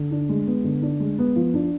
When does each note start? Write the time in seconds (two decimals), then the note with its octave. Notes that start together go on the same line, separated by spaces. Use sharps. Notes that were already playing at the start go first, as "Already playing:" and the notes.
Already playing: D3
0.11 D4
0.29 G#3
0.47 B3
0.64 D3
0.82 D4
1.00 G#3
1.19 B3
1.36 F3
1.54 D4